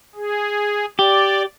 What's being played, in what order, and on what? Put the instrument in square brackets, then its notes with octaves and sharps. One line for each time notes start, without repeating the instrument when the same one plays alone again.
[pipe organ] G#4
[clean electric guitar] G4 [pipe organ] D5